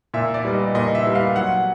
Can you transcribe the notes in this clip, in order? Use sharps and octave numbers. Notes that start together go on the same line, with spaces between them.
A#2 E5
D5
G3 B3
D#5
A#2 D#5
E5
G3 B3
F5
F#3 F#5